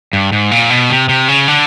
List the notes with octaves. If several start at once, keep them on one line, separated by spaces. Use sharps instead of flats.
G2
G#2
A#2
B2
C3
C3
C#3
D3